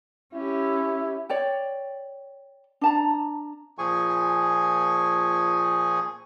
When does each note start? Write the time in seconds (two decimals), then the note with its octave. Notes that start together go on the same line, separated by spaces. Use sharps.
0.34 C#4 E4 G4
1.29 C#5 D5 G5
2.81 D4 A5 A#5
3.78 A#2 F3 G#4 G#5 C#6